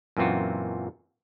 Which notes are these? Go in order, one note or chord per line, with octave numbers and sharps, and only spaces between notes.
F#2 A#2 E3 C4 F4 F#4